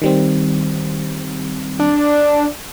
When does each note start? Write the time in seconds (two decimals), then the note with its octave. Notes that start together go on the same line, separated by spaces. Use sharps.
0.02 D#3 G3 C4
1.79 D4